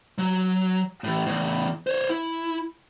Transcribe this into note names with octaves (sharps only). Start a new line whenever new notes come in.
F#3
A2 E3
E2 A2
C5 C#5
E4